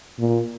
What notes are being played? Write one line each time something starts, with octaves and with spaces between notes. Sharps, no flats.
A#2